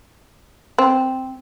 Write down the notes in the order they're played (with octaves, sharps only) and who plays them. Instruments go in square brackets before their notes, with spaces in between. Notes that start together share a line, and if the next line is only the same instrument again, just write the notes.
[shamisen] C4